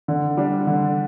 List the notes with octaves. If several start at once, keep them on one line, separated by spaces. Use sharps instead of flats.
D3
G3 D4
D3